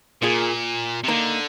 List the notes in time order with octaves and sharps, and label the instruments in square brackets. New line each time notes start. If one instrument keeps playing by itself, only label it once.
[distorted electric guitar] A#2 [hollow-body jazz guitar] A#3 F4 G#4
[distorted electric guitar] C3
[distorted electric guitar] D3 [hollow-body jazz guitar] A#3 D#4 A#4